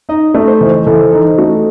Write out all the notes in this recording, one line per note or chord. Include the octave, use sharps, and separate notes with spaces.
D#4 D#5
A3
C5
E3
E3 A4
D#4 A4
A3 F#4